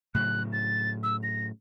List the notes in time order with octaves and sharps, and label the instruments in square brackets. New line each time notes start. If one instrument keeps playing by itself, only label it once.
[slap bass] A2 C#3 F#3 [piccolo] F#6
[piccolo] A6
E6
A#6